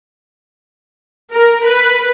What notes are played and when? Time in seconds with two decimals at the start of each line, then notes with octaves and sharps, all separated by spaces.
1.31 A#4
1.66 B4